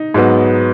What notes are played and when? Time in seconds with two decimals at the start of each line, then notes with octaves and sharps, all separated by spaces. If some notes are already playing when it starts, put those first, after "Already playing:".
Already playing: D#4
0.14 G#2 F#3 B3